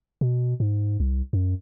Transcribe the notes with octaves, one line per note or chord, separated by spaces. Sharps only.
B2
G#2
C2
F#2